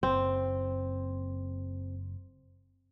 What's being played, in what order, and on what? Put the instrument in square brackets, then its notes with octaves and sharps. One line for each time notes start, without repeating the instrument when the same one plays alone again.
[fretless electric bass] F#1 [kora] C4